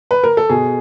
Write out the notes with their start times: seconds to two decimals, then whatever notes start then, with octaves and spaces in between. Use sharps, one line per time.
0.11 B4
0.24 A#4
0.37 A4
0.49 B2 G#4